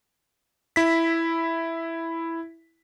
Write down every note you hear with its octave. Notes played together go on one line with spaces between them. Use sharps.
E4 B6